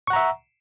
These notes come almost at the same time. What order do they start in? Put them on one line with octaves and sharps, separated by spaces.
C#6 F#5 A#5 E5